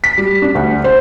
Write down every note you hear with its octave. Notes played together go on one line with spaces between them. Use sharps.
B6
G3
D4
D2
C5